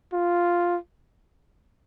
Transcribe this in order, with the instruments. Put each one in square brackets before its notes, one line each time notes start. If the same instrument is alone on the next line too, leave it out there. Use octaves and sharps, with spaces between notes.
[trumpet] F4